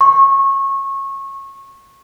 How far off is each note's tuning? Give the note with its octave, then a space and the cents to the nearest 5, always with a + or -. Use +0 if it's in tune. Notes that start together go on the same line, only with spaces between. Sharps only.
C#6 -25